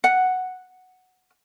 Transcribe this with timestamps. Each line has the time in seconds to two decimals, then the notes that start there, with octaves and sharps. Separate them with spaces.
0.04 F#5